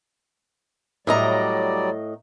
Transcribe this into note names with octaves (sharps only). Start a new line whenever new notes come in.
A2 F#3 G3 D5 D#5 A#5